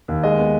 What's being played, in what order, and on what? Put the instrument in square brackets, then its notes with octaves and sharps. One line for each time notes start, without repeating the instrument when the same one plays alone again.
[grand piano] D#2
G#3 D#5
B3